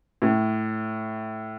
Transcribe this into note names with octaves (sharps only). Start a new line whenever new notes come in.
A2